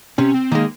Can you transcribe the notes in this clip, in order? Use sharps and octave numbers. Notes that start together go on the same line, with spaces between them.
C3 C#4
C4
D#3 G#3 A#3